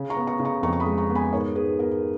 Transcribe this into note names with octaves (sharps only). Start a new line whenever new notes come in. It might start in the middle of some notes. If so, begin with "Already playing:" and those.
Already playing: C#3
A#5 C#6
B3
A#5 C#6
C#3
A#5 C#6
F2 A#5 C#6
C#6
B5 D#6
G#3
A#5 C#6
B3
G#5 B5
G#2 A#4 C#5
G#2 G#4 B4
B3 A#4
A#4